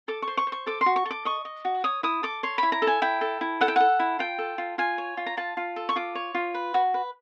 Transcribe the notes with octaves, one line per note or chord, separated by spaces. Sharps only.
A4 D6
C#6
C5
C#6
C5
C#6
A4 D6
C6
F#4
C#6
A4
D6
D#5 C#6
D#5
F#4
C#5 D#6
E4 D#6
A4 D6
C#5 C6
E4 B5
A#5
A4
G#5
E4 G5
A4
E4
A4 F#5
G5
A4 F#5
E4
F4 G5
A4
F4
F4 G#5
C#5
F4
A#5
F4 A5
F4
A4
C#6
F4 D6
C#5
F4
B4
F#4
B4